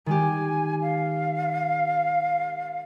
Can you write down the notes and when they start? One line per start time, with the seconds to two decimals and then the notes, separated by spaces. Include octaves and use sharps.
0.06 D#3 G#3 G4 G#5
0.81 F5